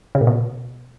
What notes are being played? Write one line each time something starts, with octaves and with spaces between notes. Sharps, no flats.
C#3
A#2
B2